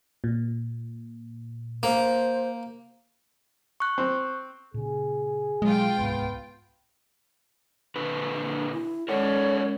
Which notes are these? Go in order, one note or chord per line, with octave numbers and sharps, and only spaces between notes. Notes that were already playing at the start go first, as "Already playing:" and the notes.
A#2
A#3 C5
C#6 F#6
C4
A#2 C#3 G#4
B2 F3 F#3 G#3 F4 G5
D1 C2 G#2 B3
A#2 D3 B4
D4
E4
G#3 C#4 A4 A#4 C#5 D5 F#5